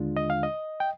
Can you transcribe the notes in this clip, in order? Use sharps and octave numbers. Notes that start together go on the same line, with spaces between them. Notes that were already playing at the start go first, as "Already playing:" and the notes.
Already playing: D#2 D3 G#3 D4 F4
D#5
F5
D#5
G5